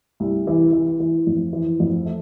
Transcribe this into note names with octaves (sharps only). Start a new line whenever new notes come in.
C2
E3
E3
E3
F2
E3
F2
A3